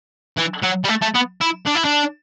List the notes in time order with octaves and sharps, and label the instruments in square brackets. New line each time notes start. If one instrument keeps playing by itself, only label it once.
[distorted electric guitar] E3
F#3
G3
A3
A3
B3
E4
D4
E4
D4